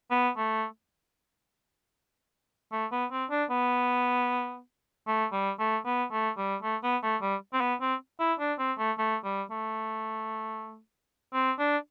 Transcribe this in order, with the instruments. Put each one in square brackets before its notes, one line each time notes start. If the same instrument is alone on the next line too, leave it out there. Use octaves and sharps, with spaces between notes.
[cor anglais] B3
A3
A3
B3
C4
D4
B3
A3
G3
A3
B3
A3
G3
A3
B3
A3
G3
C4
B3
C4
E4
D4
C4
A3
A3
G3
A3
C4
D4